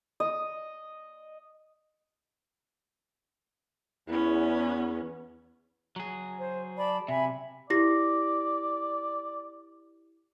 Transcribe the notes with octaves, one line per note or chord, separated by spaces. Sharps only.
D#5
E2 B3 C#4 E4
F#3 G#4
C5
D5 A5 B5
C3 E5 G#5 B5
E4 G4 D5 A#6